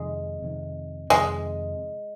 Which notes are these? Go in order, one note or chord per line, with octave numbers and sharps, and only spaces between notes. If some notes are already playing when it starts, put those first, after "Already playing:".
Already playing: F2 C3 D#3 G#3
F2 C3 D#3
F2 C3 D#3 G#3